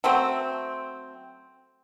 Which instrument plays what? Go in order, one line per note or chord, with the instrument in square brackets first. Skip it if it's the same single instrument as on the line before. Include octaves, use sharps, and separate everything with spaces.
[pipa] F#3 A3 C4